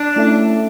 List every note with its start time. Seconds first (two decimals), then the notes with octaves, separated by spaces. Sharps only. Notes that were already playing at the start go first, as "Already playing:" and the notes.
Already playing: D4
0.16 A3 C#4 E4 A4 E5